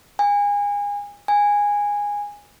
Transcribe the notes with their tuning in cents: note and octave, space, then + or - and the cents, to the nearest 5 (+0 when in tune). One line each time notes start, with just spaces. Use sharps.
G#5 -30
G#5 -15